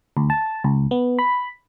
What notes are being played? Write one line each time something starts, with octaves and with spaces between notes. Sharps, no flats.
D2
A5
C#2
B3
B5